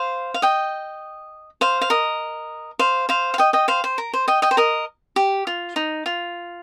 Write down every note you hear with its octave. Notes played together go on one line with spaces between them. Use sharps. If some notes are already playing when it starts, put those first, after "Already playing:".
Already playing: C5 F5
F5
D#5 G5
C5 F5
F5
A#4 D#5
C5 F5
C5 F5
F5
D#5 G5
D#5 G5
C5 F5
C5
A#4
C5
D#5 G5
D#5 G5
C5
A#4 D#5
G4
F4
D#4
F4